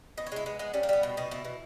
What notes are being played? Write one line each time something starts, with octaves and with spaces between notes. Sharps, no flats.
B2 D#5
C#5
G#3 E4
G#3 B3
G#3 B3
G3 C#4
A#3
G3 B3
B2
B2 D#4
B2 E4
B2